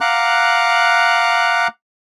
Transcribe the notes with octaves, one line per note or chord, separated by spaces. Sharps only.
F5 F#5 A#5 D6 F#6